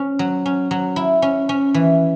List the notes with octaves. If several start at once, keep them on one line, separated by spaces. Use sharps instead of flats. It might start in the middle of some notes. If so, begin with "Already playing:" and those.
Already playing: C#4
F#3
C#4
F#3
E4
C#4
C#4
E3